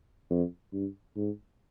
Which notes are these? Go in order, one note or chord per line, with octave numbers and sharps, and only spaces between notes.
F2
G2
G#2